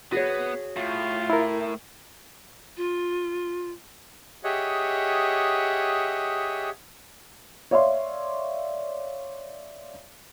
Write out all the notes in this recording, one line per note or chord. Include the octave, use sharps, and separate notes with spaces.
B3 F#4 G#4 C#5
A2 F4
E4 A#4
F4
G4 G#4 C#5 D#5 E5 F#5
C#5 D5 E5 F5 C6